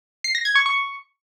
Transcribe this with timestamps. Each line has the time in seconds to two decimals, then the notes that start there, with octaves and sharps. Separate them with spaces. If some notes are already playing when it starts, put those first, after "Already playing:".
0.24 C7
0.35 A#6
0.45 G#6
0.55 C#6
0.66 C#6